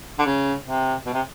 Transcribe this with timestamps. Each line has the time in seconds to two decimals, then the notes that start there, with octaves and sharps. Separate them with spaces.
0.19 D3
0.26 C#3
0.66 C3
1.06 B2
1.14 C3